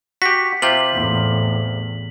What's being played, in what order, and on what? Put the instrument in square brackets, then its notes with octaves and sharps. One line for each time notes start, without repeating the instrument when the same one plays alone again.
[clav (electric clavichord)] F#4 G4 [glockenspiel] B6
[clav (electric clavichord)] C3 F4 G4 [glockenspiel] F#7
[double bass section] E2 A2